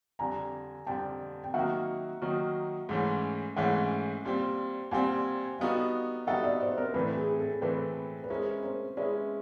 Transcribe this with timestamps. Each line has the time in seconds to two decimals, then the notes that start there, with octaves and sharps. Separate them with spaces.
0.19 F2 D3 G3 G#5 A#5
0.87 F2 D3 G3 G5 A5
1.44 G5
1.54 D#3 F#3 A#3 D#4 F#4 E5 F#5
2.22 D#3 F#3 A#3 D#4 F#4
2.89 G#2 E3 A3 C#4
3.56 G#2 E3 A3 C#4 E5 F#5
4.25 A#2 G3 C4
4.91 A#2 G3 C4 F#5 G#5
5.60 G3 B3 D#4 F#4 A4 F5 G5
6.27 G3 B3 D#4 F#4 A4 E5 F#5
6.44 D5 E5
6.60 C5 D5
6.78 A#4 C5
6.94 A2 E3 A3 C4 A4 B4
7.17 G#4
7.39 A4
7.62 A2 E3 A3 C4 A4 B4
8.24 B4
8.30 G#3 C#4 E4 A#4 C5
8.63 A#4 C5
8.97 G#3 C#4 E4 B4 C#5